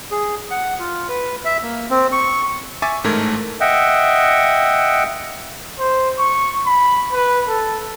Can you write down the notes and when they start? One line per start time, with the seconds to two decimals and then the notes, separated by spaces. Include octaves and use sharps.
0.11 G#4
0.51 F#5
0.79 F4
1.09 B4
1.45 E5
1.62 A#3
1.90 C4
2.12 C#6
2.82 E5 G#5 C#6 D6 A6
3.04 A1 G#2 A3 A#4 G#6
3.61 D#5 E5 F#5 G5
5.79 C5
6.18 C#6
6.66 B5
7.13 B4
7.48 A4